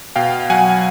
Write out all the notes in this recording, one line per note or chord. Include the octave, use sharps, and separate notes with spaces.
B2 F5 G5
F#3 F#5 G#5